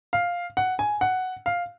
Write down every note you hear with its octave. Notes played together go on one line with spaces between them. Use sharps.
F5
F#5
G#5
F#5
F5